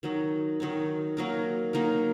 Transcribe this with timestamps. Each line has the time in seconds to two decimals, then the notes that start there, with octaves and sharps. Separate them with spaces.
0.03 D#3 F#3 D#4
0.60 D#3 F#3 D#4
1.17 F#3 A#3 D#4 A#4
1.73 F#3 A#3 D#4 A#4